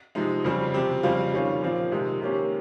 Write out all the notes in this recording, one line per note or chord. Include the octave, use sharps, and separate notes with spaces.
C3 F3 G#3 D#4
F2 C#3 G3 C4
C3 F3 C4 G4
F2 C#3 G3 C4 F4
D#3 G3 C#4 F4
A#2 F3 C4 F4
C3 D#3 G#3 D#4
C3 D#3 A#3 C#4 G4